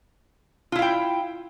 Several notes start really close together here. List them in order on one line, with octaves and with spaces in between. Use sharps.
F4 E4 F5 G5